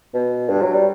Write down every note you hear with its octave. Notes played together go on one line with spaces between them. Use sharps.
B2
G2
F#3
G3